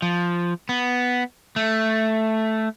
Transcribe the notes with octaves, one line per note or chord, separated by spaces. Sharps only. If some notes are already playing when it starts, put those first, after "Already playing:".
F3
B3
A3